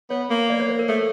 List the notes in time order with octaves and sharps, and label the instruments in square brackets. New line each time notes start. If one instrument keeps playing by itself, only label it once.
[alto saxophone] B3 [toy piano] C#5
[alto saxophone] A#3
[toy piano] D5
C#5
C5
A#4
[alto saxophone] A3 [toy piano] A4